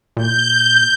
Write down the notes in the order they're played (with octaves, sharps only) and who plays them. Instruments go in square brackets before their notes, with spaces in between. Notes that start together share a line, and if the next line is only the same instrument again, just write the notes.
[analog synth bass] A#2 [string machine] G6